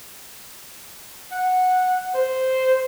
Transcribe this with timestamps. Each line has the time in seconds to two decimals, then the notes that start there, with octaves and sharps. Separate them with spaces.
1.32 F#5
2.15 C5